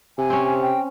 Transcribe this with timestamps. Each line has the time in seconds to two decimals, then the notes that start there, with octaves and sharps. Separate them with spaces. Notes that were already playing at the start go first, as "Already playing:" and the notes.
0.18 C3 G#5
0.30 C4 C#4
0.61 G5